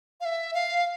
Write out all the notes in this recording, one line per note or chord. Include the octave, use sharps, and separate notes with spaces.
F5
E5
F5